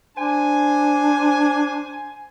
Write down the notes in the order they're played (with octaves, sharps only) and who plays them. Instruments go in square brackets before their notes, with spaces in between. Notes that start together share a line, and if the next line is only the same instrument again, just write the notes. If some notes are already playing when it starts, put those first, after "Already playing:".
[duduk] D4 [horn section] C5 G#5